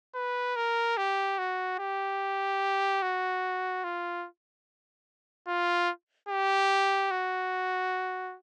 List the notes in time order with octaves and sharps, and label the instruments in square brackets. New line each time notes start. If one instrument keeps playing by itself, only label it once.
[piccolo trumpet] B4
A#4
G4
F#4
G4
F#4
F4
F4
G4
F#4